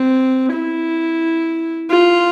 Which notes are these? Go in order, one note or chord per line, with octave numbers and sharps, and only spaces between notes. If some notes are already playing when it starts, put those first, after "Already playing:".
Already playing: C4
E4
F4